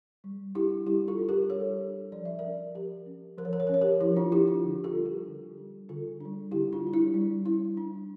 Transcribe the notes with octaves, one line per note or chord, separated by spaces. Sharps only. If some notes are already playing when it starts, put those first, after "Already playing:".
G3
D4 E4 G4
G3 E4 G4
F4 A4
D4
G4 A#4
G3 A4 C#5
D4
F3 D5
E5
A#4 D5
C#4
F3 G4 A#4
C#4
F3 A#4
C#5
A#4
C#5
C#4 A#4
C#5
G4 A#4
F3 E4 G4
D4 F4
C#4 E4 G4
D4 F4
D3
F4 A4
G3 D4
G4 A#4
D3
G3 D4
D3 F4 A4
G3 D4
D3 E4 G4
D4 F4
G3 D4
E4
G3
C#4 E4
G3 D4